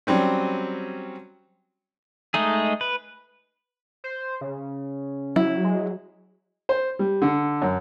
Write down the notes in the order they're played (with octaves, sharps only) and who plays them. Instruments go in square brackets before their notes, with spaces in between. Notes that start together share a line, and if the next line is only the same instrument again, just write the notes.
[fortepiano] F#3 G3 C4 C#4
[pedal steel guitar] G#3 A3 D#4 G#4
B4
[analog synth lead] C5
C#3
[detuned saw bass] F#3 [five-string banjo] E4
[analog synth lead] G#3
[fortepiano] C5
G3
D3
F#2